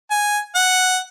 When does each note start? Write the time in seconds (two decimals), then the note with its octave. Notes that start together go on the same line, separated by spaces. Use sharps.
0.11 G#5
0.55 F#5